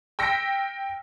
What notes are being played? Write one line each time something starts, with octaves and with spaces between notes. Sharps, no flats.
G5 E6 A#6 B6 C#7